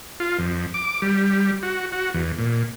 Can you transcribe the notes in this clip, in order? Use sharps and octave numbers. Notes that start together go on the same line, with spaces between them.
F4
F2
D6
G3
F#4
F#4
E2
A#2